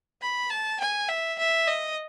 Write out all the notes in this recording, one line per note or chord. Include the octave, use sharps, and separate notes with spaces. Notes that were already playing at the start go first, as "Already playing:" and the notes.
B5
A5
G#5
E5
E5
D#5